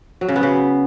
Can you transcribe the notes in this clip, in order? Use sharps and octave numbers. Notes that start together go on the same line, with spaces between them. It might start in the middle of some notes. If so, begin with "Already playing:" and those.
F#3
C#3
B3
C#3